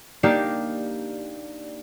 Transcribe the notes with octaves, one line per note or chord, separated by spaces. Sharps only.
A#3 D4 D#4 G4 D5